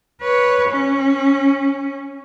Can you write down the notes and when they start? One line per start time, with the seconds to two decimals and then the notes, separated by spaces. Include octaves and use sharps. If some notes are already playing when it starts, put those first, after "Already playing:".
0.21 B4 C#5
0.68 C#4